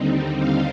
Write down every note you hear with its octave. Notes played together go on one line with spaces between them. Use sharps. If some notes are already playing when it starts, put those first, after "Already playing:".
Already playing: D#2 D3 G3 C4 D#4
F5